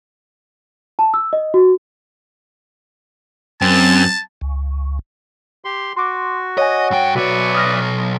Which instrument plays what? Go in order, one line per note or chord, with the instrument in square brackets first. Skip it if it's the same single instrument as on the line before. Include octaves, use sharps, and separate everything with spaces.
[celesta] A5
E6
D#5
F#4
[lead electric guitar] F#2 [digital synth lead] C4 [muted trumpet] A5
[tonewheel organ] C#2
[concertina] G4 C6
[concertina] F#4 [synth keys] C6 D6
[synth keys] C#5 F#5 G#5 [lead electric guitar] D#5
[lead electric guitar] G2 G5
[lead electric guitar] B1 C#5 [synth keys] F#4 [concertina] B4 D5 E5
[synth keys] D#6 F6 A#6